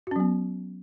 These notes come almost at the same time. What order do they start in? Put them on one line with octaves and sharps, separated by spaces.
F#4 C#4 F#3 B3